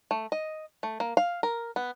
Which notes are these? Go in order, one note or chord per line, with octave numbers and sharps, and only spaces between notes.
A3
D#5
A3
A#3
F5
A#4
B3